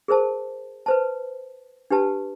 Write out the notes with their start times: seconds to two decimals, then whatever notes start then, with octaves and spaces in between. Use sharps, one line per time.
0.08 G#4 A#4 C5 A5
0.86 B4 C5 A5
1.90 D4 G4 B4 A5